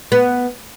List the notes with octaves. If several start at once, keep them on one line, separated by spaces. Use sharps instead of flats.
B3